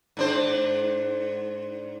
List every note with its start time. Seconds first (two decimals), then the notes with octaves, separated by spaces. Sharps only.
0.17 G#2 D4 C5